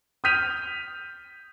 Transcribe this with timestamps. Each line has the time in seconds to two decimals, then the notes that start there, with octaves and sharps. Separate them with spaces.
0.24 D#6 F6 G6 B6 D#7 F7